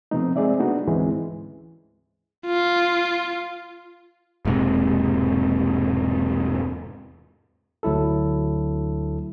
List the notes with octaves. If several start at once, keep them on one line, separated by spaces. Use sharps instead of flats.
C3 F3 A3 B3 C4 D#4
G#3 C4 G#4 D5 E5
A3 B3 D4 D#4 F#4
D2 G#2 E3 G#3 C4 C#4
F4
E1 G#2 C3
D2 F#3 E4 A4